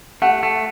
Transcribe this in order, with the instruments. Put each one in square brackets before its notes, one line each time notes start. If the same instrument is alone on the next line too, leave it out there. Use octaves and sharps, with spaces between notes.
[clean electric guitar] A3 [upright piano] F#5
[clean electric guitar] A3